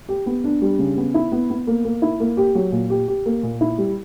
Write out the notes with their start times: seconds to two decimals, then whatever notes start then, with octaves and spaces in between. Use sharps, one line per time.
0.09 G4
0.26 B3
0.44 D4
0.62 G3
0.79 C#3
0.97 B3
1.14 E4
1.32 B3
1.50 B3
1.67 A#3
1.85 A#3
2.02 E4
2.20 A#3
2.37 G4
2.55 F#3
2.72 A#2
2.90 G4
3.08 G4
3.26 A#3
3.43 A#2
3.61 E4
3.78 G3